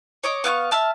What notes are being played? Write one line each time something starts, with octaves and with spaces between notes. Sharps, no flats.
C#5 D#5 D6
B3 F5 G5 C#6
E5 A5 F6